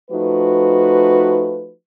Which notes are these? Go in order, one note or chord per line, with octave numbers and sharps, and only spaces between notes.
F3 A3 D#4 F#4 B4